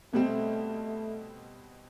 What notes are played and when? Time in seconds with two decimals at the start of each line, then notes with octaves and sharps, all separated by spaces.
0.13 B2 G3 A3 C4